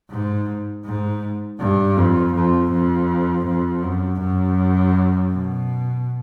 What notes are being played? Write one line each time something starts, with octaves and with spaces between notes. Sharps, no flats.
G#2
G#2
G2
F2
F2
F2
F2
F#2
F#2
B2